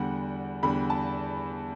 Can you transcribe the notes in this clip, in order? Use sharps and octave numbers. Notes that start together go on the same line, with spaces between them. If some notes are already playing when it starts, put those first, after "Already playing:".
Already playing: E2 D3 G3 F#5
E2 D3 G3 B5
A5